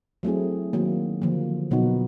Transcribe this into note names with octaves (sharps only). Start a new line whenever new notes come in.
F#3 A3 C4 E4 G#4
D#3 F#3 A#3
D3 F3 A#3
B2 F#3 B3 D#4 F#4